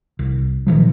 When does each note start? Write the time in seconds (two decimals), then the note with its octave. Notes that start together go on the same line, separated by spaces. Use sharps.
0.19 C2
0.67 A#2 D#3 F3 F#3